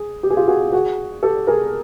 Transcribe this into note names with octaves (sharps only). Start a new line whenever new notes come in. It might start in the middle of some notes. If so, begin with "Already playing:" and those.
Already playing: G#4
G4
G#4
F4 G4
F#4 G#4
F#4 G#4
G4 A4
G#4 A#4